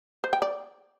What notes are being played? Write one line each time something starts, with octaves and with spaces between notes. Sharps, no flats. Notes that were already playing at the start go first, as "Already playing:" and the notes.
C5
G5
D5